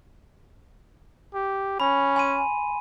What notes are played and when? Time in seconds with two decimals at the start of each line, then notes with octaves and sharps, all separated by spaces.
1.34 G4
1.80 C#4 B5
2.16 G#5 C6 D#7